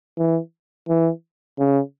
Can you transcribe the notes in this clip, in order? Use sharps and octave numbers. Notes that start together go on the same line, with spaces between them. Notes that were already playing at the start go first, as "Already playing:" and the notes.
E3
E3
C#3